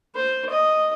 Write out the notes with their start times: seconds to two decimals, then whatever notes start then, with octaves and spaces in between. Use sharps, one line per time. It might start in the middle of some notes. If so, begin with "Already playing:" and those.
0.15 C5
0.50 D#5